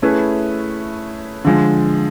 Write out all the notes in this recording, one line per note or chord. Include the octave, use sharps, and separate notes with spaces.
A3 C#4 E4 G#4 B4
D3 F3 G#3